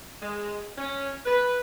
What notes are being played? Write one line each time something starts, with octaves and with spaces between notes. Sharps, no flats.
G#3
C#4
B4